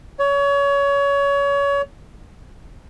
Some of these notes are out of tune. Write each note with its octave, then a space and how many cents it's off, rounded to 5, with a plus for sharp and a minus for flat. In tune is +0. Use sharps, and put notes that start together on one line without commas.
C#5 +25